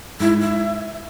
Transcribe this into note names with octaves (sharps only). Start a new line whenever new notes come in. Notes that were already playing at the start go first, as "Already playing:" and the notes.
G#2 E4
E5